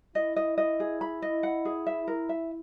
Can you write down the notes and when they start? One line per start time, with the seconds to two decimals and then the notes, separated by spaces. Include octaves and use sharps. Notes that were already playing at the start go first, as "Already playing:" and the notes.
0.15 E4 D#5
0.36 D#5
0.58 D#5
0.80 G#4
1.01 B5
1.22 D#5
1.43 F#5
1.65 G#4
1.87 E5
2.08 A#4
2.29 E5